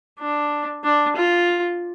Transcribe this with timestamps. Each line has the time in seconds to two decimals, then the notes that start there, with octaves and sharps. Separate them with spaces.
0.19 D4
0.84 D4
1.16 F4